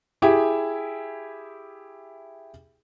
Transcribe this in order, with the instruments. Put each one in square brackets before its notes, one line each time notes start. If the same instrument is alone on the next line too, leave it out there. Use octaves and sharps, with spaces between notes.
[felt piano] E4 G4 G#4 E5